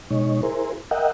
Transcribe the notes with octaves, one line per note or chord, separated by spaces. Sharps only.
B2 G#3 D#4 C#5
E4 G#4 A#4 C5
A#4 D#5 E5 F#5 G5